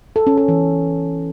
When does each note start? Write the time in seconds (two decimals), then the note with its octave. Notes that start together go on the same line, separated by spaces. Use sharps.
0.16 A4
0.27 C#4
0.37 A4
0.48 E3